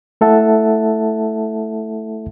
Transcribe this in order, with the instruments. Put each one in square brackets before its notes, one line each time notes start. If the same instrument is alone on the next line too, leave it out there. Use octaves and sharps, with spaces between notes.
[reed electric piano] A3 E4 A4 E5 F#5 A5